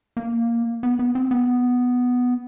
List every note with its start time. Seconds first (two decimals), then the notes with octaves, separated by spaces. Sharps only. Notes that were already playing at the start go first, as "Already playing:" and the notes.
0.17 A#3
0.83 B3
0.99 B3
1.15 C4
1.31 B3